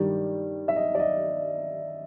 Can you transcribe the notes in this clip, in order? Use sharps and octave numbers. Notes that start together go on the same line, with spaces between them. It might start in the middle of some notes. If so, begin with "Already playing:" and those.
Already playing: G2 D#3 G3 D5
E5
D#5
D5
D#5